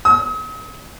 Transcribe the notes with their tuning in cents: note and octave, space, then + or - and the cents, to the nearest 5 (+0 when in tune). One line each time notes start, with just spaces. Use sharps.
D#6 +45